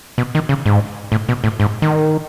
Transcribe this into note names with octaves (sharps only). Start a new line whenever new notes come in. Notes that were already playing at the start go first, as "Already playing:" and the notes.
B2
D#3
C#3
G#2
A2
B2
A2
G#2
D#3